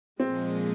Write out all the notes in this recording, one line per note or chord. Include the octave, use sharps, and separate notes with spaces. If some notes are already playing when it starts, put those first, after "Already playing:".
A#2 F3 G#3 C4